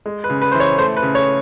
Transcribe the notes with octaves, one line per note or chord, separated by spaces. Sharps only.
G#3
B4
C#3
B4
E3 C5
C#5
A3 C5
B4
C#3
C#5